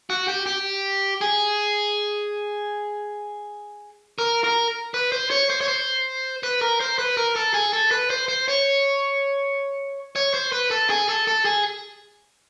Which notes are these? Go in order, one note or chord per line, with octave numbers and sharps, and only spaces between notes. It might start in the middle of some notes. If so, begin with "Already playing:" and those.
F#4
G4
G4
G#4
A#4
A#4
B4
C5
C#5
C5
C#5
C5
B4
A#4
C5
B4
A#4
A4
G#4
A4
B4
C5
C5
C#5
C#5
C5
B4
A4
G#4
A4
A4
G#4